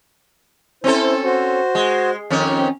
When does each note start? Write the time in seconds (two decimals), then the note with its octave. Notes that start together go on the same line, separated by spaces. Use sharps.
0.84 C4 C#4 E4 A4 C5
1.24 F#4 C5
1.75 G#3
2.30 F2 D#3 C#4
2.56 C4